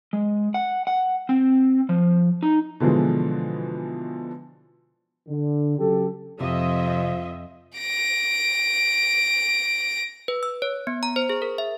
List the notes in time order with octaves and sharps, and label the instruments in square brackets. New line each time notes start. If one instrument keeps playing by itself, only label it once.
[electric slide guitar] G#3
F#5
F#5
C4
F3
D#4
[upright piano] B2 D3 E3 F3 G#3
[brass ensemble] D3
C#3 F#3 G4 A4
[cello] F2 [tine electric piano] C3 [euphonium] F3 [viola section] D#5 E5
[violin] A#6 D7
[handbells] B4
E6
C#5
B3
A#5
C5
G#4
A#4
E5